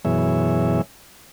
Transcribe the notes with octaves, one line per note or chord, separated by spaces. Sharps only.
F#2 B2 E3 G#4 C#5 E5